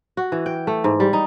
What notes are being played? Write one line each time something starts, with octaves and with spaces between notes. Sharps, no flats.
F#4
E3
G5
A3
G#2
G3
D#4